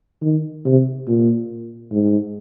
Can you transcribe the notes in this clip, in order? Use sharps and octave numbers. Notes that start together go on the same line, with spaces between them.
D#3
C3
A#2
G#2